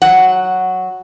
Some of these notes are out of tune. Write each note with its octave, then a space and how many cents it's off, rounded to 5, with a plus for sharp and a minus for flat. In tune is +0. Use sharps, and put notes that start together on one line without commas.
F#3 +0 F#5 +0